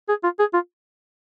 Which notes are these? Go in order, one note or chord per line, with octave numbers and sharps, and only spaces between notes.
G#4
F4
G#4
F4